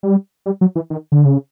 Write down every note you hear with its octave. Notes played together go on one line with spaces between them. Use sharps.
G3
G3
F#3
E3
D#3
D3
C#3